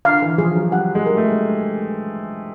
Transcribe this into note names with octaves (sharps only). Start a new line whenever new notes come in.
D3 F5
E3
F3 G#4
F#3
G3 F#5
G#3
A#4
A3